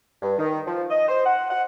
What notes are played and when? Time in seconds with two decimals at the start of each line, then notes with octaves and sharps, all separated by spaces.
0.22 G2
0.38 D#3
0.67 F3
0.90 D#5
1.08 C5
1.26 F#5
1.50 F#5